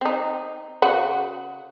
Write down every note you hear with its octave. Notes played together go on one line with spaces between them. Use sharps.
C4 D#4
C#3 F#4 F#5